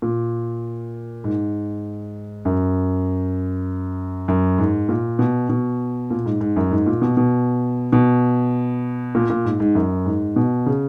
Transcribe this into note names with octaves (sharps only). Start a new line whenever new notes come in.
A#2
G#2
F#2
F#2
G#2
A#2
B2
B2
A#2
G#2
G#2
F#2
G#2
A#2
B2
B2
B2
A#2
A#2
G#2
G#2
F#2
G#2
B2
C#3